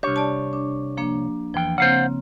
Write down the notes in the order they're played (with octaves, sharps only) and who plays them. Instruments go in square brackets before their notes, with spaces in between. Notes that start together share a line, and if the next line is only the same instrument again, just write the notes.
[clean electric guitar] C2 C#5 [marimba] D4 G4
[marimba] D5 A5
D4
F3 A#3 D4
[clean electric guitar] E2 G5 [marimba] F3
[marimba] C#3 A#3 C4 [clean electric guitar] C5 F5 F#5